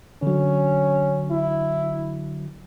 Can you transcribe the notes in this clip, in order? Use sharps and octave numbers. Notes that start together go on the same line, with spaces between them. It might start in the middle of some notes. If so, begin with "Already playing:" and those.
D3 F#3 C#4
E4